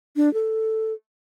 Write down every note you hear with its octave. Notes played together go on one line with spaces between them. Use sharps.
D4
A4